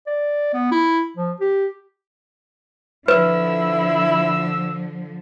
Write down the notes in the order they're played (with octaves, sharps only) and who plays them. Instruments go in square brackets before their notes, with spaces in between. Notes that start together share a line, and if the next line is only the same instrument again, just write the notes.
[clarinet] D5
B3
E4
F3
G4
[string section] D3 F3 [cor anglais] E4 [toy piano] B4 [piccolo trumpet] E6